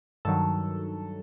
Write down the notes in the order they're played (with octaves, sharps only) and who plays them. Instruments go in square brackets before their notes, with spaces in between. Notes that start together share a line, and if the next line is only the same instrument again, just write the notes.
[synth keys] G2 D#3 F#3 A4